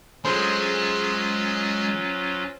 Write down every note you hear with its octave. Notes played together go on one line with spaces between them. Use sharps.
F#3 G#3 C#4 F4 C5